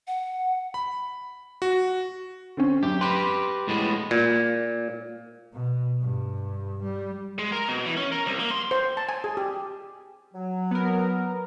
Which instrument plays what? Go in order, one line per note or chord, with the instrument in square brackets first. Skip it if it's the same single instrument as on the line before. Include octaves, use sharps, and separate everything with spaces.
[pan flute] F#5
[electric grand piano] B5
F#4
[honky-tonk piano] D3 C4 C#4
[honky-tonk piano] F#2 [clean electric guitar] G4
[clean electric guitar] G4 B4 [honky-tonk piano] C6
[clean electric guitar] A2 G#3 B3
[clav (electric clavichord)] A#2
[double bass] B2
G2
G3
[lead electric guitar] G#3
A#4
B2
E3
C#4
A#4
C2
A#3
C6
[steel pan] C5
A5
G#5
G#4
G4
[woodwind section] F#3
[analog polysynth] B3 A#4